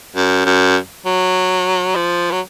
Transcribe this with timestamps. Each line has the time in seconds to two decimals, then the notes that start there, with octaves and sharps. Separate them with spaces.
0.16 F#2
0.45 F#2
1.06 F#3
1.95 F3
2.31 F#3